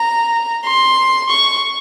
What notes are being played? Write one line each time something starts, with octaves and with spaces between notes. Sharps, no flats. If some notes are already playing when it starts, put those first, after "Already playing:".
Already playing: A#5
C6
C#6